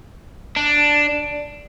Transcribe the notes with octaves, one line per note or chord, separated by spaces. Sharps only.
D4